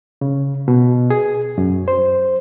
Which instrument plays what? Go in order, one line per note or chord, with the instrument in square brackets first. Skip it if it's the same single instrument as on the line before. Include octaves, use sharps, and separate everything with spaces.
[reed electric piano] C#3
B2
G#4
F#2
C5